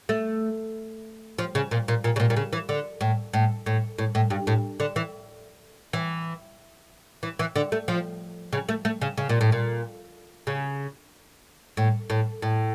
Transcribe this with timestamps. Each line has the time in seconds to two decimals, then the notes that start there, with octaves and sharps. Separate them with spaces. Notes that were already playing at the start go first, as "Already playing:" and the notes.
0.09 A3
1.39 F3
1.55 C#3
1.71 A#2
1.88 A#2
2.04 A#2
2.16 C#3
2.20 A#2
2.30 A#2
2.37 C#3
2.53 E3
2.69 D3
3.01 A2
3.33 A2
3.66 A2
3.98 A2
4.15 A2
4.30 G2
4.47 A2
4.80 D3
4.96 E3
5.93 E3
7.23 E3
7.39 E3
7.56 D3
7.72 A3
7.88 F3
8.53 C#3
8.69 A3
8.85 A3
9.01 C#3
9.18 C#3
9.29 A#2
9.41 A2
9.52 A#2
10.47 C#3
11.77 A2
12.10 A2
12.42 A2